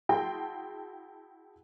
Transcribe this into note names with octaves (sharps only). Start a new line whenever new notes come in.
E4 F#4 G#4 G5 A5 C6